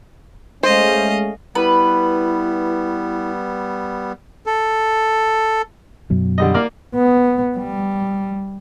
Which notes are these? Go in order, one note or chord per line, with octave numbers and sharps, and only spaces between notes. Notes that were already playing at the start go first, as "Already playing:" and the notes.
G#3 A3 C#4 C5 D#5 F5
G3 B3 E4 B4
A4
F#2 B2 F#3
D3 G3 D#5
A#3 D5 F6
B3
G3